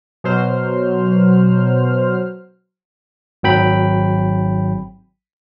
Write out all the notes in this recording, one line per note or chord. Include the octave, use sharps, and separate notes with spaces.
B2 F#3 C5 F6
G#1 F#3 G5 B5